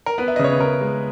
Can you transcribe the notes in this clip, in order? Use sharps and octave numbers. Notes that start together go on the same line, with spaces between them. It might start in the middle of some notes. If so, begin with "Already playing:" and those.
A#4
B3 B4
E5
D#5
C#3 C#5
B4
C#3 A#4
G#3